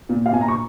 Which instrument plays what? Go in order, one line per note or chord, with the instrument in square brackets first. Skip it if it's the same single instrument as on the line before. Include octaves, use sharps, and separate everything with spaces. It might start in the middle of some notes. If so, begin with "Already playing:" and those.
[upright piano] A#2
F5
A#2 G#5
A#5
C#6